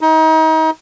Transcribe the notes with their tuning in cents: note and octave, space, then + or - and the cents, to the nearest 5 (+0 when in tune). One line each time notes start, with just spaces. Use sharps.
D#4 +35